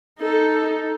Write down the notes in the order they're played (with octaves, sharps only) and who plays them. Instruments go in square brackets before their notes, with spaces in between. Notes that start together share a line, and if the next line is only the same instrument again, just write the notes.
[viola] D#4 A4